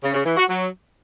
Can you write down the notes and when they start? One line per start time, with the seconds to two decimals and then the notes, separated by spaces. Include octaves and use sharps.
0.03 C#3
0.14 C#3
0.25 E3
0.37 F#4
0.48 F#3